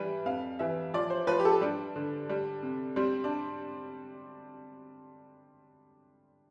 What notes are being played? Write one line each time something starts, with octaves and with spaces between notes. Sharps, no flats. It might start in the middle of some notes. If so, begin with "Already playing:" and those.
Already playing: E3 G3 B4
F2 F5
E3 E5
F3 D5
C5
F3 B4
G4
A4
G3 D4
D3
G3
C3
G3 C4
D4